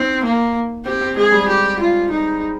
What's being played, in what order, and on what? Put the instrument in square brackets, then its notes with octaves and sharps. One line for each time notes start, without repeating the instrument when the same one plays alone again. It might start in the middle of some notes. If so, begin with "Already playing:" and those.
Already playing: [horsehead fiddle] C4 [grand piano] D#4
[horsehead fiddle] A#3
[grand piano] C4 [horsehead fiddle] G4
[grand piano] C4
[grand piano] G#3 [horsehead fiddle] G#4
[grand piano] G3
[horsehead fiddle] G4
F4
D#4